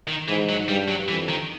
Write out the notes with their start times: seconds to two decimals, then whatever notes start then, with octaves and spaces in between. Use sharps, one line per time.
0.08 D#3
0.28 G#2 E3
0.49 F#3
0.68 G2 G3
0.88 F#3
1.08 F2 E3
1.29 D#3